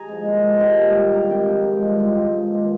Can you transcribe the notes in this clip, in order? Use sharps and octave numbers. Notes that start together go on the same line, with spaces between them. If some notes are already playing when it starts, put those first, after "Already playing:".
Already playing: G#4 G#5 A#5
F3 G#3
A#2
F3 G#3
A#2 G4 G5
G3 A#3
G#2
D#3 G3 A#3 A#5
G#5
C3 G4 G5
F3 G#3
G#2
D#3 G3 A#3
G#2 F4 F5
F3 G#3
G2
D#3 A#3